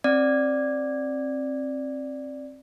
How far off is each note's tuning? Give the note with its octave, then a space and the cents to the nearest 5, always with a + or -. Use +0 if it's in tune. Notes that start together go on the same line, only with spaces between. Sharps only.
C4 +25 D5 +0